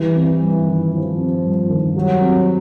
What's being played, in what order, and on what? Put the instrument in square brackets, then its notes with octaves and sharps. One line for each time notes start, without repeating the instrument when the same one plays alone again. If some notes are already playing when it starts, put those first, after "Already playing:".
Already playing: [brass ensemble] E3 [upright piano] G3
[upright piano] C4
G2
D#3
[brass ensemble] F3 [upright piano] G3
[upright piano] C4
G2
D#3
[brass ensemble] F#3 [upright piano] G3
[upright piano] C4